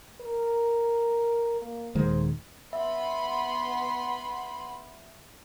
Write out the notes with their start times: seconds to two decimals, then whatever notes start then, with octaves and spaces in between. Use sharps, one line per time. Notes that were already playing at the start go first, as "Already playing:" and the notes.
0.21 A#4
1.61 A#3
1.95 D#1 D#3 G#3 C5
2.73 B3 E5 B5 C6